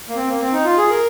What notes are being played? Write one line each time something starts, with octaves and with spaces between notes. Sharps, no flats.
A#3
C4
A#3
C4
D#4
F4
G#4
A#4